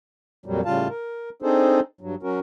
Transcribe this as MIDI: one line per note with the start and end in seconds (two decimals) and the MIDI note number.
0.46 0.61 41
0.46 0.61 46
0.46 0.61 54
0.46 0.61 55
0.66 0.88 45
0.66 0.88 49
0.66 0.88 55
0.66 0.88 65
0.66 0.88 77
0.66 0.88 81
0.89 1.30 70
1.42 1.80 60
1.42 1.80 62
1.42 1.80 63
1.42 1.80 68
1.42 1.80 69
1.42 1.80 72
2.01 2.15 43
2.01 2.15 54
2.23 2.40 54
2.23 2.40 61
2.23 2.40 66
2.23 2.40 70